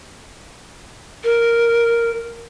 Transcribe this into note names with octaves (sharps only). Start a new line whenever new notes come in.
A#4